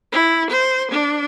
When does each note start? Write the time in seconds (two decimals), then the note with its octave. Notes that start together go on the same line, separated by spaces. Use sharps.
0.12 E4
0.50 C5
0.91 D4